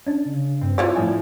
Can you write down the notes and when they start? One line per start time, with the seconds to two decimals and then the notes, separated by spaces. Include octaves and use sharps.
0.07 C#4 D4
0.25 C#3
0.61 G2 C4
0.78 E4 F4 C#5 D5 E6
0.95 A2 F3 G#5